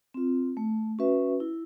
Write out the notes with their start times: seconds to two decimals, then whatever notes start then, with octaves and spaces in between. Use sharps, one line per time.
0.14 C4 F4
0.57 A3
0.99 C#4 F#4 B4 E5
1.40 E4